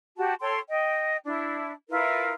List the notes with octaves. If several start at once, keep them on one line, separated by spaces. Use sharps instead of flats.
F#4 G4 A5
A4 C#5 G5 C6
D#5 G5
D4 E4
E4 F4 A#4 B4